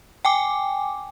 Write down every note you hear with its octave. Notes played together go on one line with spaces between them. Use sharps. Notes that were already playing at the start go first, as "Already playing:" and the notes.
G5 G#5 D6